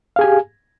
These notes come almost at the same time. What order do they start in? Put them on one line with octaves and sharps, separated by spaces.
F5 G#4 G#5 G4